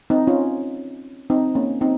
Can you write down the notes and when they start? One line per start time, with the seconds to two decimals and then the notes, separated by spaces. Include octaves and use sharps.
0.10 C4 D#4
0.27 C#4 F4
1.30 C4 D#4
1.55 A#3 C#4
1.81 C4 D#4